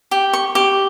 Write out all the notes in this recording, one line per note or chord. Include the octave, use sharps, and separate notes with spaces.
G4
C#6
G4